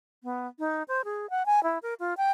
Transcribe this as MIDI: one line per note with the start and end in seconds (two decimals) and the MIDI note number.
0.24 0.47 59
0.59 0.83 63
0.88 1.02 72
1.05 1.30 68
1.30 1.46 78
1.46 1.63 80
1.63 1.78 64
1.82 1.94 70
2.00 2.14 65
2.17 2.32 79